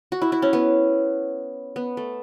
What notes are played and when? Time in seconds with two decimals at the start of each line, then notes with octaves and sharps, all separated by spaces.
0.12 F#4
0.22 E4
0.32 E4
0.42 C#4
0.53 B3
1.76 B3
1.97 A3